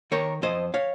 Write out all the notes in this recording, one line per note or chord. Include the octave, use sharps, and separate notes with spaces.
D#3 A#4 C#5
F2 C5 D#5
C#5 F5